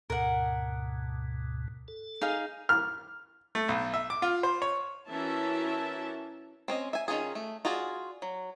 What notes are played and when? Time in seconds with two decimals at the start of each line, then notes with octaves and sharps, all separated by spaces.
0.10 D2 G#2 B2 A#4 F#5
1.88 A4
2.21 D#4 G#4 F5
2.69 F6
3.55 A3
3.68 B1
3.94 E5
4.10 D6
4.22 F4
4.43 C5
4.62 C#5
5.07 E3 C#4 F#4 A#4 E5 A5
6.68 C4 C#4 D#5
6.93 E5 G#5
7.08 D#3 C#4 F4 G#4
7.35 A3
7.65 F4 F#4 G#4 D5
8.22 F#3